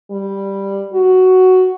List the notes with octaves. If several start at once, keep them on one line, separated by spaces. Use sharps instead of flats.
G3
F#4